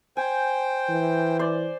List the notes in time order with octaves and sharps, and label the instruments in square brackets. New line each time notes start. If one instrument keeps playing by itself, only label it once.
[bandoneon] C5 G5 [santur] G#5
[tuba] E3
[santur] C5 D5